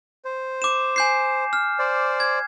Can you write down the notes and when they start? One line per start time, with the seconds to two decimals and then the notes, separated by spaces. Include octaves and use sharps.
0.25 C5
0.62 D6 E7
0.96 G#5 G6 C7
1.53 F6
1.79 C5 D5
2.20 G#6